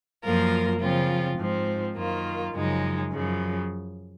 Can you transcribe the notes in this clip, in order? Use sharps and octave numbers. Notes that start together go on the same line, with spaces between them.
F#2 F3 A#3 F4 A#4
C#3 F3 C4 F4
G#2 F3 C4
F#2 D#3 A#3 F4
F#2 C#3 F3 G#3 D#4
F#2 C#3 F3